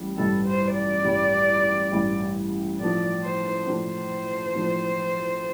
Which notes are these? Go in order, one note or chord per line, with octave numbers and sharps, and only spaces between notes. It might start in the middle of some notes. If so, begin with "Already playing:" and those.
Already playing: A1 G3
A1 G2 G3 A4
C5
D5
A1 G2 G3
A1 G2 G3
A2 F3 D4 D5
C5
A2 F3 D4 C5
A2 F3 D4